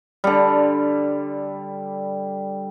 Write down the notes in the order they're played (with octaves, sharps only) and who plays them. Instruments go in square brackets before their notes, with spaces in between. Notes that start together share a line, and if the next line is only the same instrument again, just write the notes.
[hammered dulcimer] D3 G3